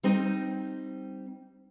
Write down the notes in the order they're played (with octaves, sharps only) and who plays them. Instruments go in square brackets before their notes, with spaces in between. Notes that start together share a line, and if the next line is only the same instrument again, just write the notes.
[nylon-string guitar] G3 C4 D#4